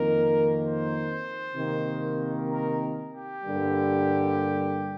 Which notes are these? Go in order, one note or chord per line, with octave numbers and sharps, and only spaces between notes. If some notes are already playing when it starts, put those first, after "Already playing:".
Already playing: F2 D#3 A#3 A#4
C5
C3 D#3 A#3
A#4
G4
G2 D3 G3 A#3